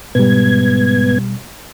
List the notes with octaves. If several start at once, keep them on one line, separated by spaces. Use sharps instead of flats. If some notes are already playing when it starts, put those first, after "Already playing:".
G#2 B2 G3 B3 G#6